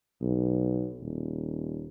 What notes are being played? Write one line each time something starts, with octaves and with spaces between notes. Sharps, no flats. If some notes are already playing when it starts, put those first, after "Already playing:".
B1
D#1